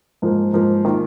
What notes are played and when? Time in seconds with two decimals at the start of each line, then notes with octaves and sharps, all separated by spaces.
0.22 G#2 F3 A#3
0.53 G#2 F3 A#3
0.85 D#3 A#3 F4